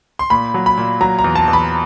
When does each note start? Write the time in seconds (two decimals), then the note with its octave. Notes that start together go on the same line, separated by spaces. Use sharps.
0.19 C6
0.30 A#2 B5
0.54 F#3
0.66 B5
0.77 A#2
1.01 F#3 A#5
1.19 A#5
1.24 E2
1.35 A5
1.48 E2
1.53 B5